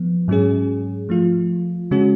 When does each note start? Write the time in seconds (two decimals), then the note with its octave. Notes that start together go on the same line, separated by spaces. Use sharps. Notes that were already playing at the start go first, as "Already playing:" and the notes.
Already playing: F3 B3
0.28 G#2 F#3 C#4 G#4
1.09 F3 A3 F4
1.91 C#3 G#3 C#4 F#4